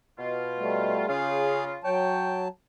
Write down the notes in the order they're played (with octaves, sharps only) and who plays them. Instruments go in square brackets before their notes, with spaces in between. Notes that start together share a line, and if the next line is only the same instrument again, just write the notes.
[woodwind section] B2 F4
[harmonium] G3 A3
[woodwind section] C#3 F4 [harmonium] G#4 F5
[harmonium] F#3 A5 [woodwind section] C#5 G5